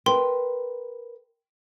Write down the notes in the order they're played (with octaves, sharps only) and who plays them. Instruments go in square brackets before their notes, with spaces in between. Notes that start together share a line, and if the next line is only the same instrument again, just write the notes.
[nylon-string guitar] A#4 B4 [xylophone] G5 C6